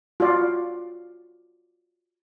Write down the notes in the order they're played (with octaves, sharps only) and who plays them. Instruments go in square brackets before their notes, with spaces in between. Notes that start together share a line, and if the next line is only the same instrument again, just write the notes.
[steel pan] F4 F#4 D5